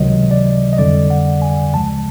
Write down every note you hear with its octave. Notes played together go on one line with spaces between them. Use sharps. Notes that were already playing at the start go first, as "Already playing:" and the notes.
Already playing: C#2 C3 D#3 F#3 D#5
D5
D#5
F2 D3 G3 D5
F#5
G#5
D2 C#3 F3 G#3 A5